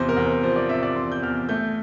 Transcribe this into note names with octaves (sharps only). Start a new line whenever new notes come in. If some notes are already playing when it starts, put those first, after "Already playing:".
Already playing: E2 C3 F3 C5
A#4
E2
C5
F3 C5
D5
C3 E5
D5
E2 C6
G6
E2 F6
A3 G6